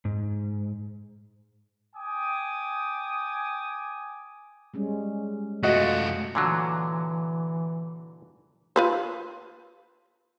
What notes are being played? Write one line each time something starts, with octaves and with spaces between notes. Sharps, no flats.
G#2
G5 G#5 D6 D#6
G3 G#3 C#4
A3 F4 F#4 D#5
A#2 D3 E3 F#3
F4 B4 C5